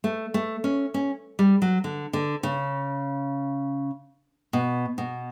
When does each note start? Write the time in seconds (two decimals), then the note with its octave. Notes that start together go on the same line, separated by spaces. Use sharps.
0.04 A3
0.34 A3
0.64 C#4
0.94 C#4
1.39 G3
1.62 F#3
1.84 D3
2.13 D3
2.43 C#3
4.53 B2
4.98 B2